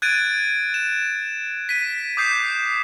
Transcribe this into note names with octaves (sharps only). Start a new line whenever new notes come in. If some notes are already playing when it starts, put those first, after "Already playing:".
F#6 G#6 A6 D7 D#7
E7
B6 D#7
D6 D#6 G6 C7